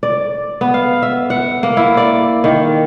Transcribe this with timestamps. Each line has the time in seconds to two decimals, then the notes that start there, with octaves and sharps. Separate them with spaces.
0.03 D5
0.61 B3
0.74 F5
1.02 E5
1.30 F#5
1.63 A#3
1.77 E4
1.97 D5
2.44 D#3